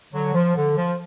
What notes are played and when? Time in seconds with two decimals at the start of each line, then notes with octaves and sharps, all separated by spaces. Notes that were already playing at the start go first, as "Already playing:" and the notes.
0.13 D3 F#3
0.34 F3
0.56 D3
0.76 F3